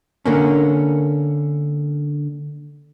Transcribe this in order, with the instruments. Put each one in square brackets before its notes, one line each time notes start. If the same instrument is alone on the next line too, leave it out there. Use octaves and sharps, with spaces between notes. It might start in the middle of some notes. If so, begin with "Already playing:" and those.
[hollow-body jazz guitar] D3 A#3 C#4